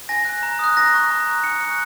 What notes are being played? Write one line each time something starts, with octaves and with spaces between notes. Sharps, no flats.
G#5 A#6
F#6
A#5
D#6 F#6
A#5 A#6
C#6 F#6
A#5
F#6
G#5 C#7
C#6 F#6